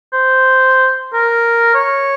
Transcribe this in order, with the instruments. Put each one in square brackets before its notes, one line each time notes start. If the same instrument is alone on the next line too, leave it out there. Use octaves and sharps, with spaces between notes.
[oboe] C5
A#4
C#5